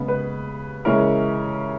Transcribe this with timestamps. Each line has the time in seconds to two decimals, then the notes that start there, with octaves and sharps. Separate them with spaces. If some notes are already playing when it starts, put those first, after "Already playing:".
Already playing: C#3 G#3 B3
0.08 B4
0.85 C#3 E3 G#3 C#4 A#4